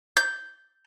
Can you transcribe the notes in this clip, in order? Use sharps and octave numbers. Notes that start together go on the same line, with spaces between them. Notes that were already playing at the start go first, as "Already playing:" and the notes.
G6